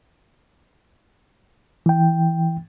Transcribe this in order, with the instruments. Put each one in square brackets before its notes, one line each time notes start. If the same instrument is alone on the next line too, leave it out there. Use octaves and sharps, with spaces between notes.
[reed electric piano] E3 G5